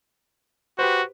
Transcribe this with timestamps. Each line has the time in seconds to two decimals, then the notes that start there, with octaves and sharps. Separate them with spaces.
0.79 F#4 G4 B4 C5